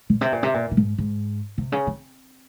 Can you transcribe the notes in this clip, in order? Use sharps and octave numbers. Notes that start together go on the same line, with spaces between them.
A#2
C3
A#2
C3
A#2
A#2
G#2
G#2
C3
C#3
C4